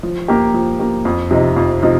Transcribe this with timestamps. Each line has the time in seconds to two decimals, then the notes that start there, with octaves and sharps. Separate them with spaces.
0.03 F3
0.28 A#3 G4
0.54 F3
0.79 A#3 G4
1.05 F2
1.31 C3 F3 D#4
1.57 F2
1.82 C3 F3 D#4